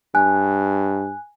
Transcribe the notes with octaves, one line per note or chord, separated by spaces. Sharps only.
G2 G#5 F#6